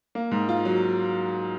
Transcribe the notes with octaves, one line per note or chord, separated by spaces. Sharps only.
A#3
G#2
F4
F#3